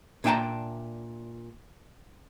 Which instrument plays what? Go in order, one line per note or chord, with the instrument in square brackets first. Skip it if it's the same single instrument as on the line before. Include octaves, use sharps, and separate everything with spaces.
[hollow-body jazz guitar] A#2 D4 E5 G5 A5 A#5